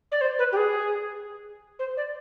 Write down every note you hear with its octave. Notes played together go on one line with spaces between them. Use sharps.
D5
C5
B4
G4
G#4
C5
D5